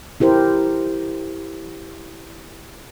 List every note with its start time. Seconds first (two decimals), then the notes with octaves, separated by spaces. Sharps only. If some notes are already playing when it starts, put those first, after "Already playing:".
0.20 E4 G4 A#4 C5